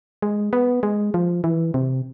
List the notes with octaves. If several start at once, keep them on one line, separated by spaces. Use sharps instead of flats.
G#3
B3
G#3
F3
E3
C3